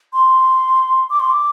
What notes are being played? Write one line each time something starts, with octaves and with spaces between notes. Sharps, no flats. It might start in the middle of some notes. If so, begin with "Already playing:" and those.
C6
D6
C6
D6